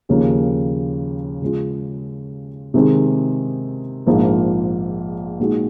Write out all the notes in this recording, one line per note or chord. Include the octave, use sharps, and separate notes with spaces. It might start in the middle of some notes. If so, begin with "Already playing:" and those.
D#2 C#3 F3 A#3 C#4
C#3 G#3 C#4 F4
C3 D#3 G#3 C4
A#1 G#2 F3 A#3
A#2 G#3 D#4 F#4